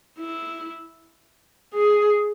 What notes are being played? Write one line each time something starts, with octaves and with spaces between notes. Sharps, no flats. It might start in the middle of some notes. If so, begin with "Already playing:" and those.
E4
G#4